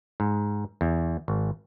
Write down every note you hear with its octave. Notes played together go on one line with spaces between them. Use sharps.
G#2
E2
G#1